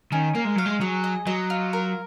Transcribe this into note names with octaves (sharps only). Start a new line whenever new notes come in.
D#3 C#4
A#3 A#4
G#3
F#3 F5
G#3
F#3 G#4
D#5
F#3 D#5
F4
A#4